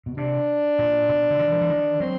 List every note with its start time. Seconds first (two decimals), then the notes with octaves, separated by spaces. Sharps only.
0.06 B2
0.17 C3 D4
0.79 A#2
1.09 B2
1.30 D3
1.39 D#3
1.52 F3
1.61 E3
1.70 D#3
2.00 F#3 C4